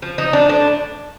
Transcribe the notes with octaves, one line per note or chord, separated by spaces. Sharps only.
F3
F3 D#4
F3 D4
A2 D4